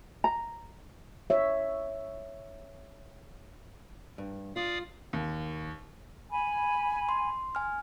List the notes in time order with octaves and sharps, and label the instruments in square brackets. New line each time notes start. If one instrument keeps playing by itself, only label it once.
[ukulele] A#5
[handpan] C#5 E5
[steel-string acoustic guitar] G2
[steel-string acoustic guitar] F4 [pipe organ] D5 F5 D#6
[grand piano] D#2
[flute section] G#5 B5
[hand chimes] C6
G#5 F6